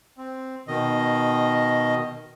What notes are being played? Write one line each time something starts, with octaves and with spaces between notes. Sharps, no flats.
C4
B2 D#3 D#5